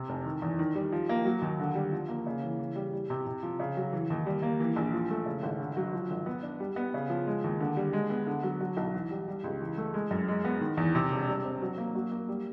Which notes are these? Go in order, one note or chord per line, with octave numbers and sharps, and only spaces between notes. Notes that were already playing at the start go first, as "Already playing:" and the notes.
Already playing: C3
F1
D#3
E2
D#3
G3
F3
A#3
F#3
D#2
D3
G3
F3
A#3
C#3
E3
E3
G3
G3
C3
C3
F3
C#3
F#3
E3
D#2
G3
A#3
E3
A#1
F3
A3
C#3
G#1
D3
F#3
F3
G#1
B3
D4
G3
B3
C#3
F3
G#3
D#2
D3
G3
G#3
B3
D3
F#3
F#3
B1
E3
G3
G3
C#2
E3
A3
G#3
F#2
G#3
B3
D#3
E2
C3
E1
G3
C4
F#3
A#3
F#3
A#3
G3